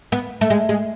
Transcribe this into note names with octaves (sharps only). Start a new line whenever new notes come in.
B3
A3
G#3
G#3